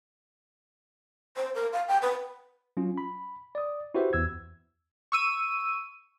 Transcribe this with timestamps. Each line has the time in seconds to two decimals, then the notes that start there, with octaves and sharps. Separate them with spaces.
1.37 C5
1.55 A#4
1.73 F5
1.88 G5
2.02 B4
2.77 F#3 C#4 F4
2.98 B5
3.55 D5 D#6
3.94 E4 F#4 G4 B4 C5 E5
4.13 E2 E6 G#6
5.12 C#6 E6 D#7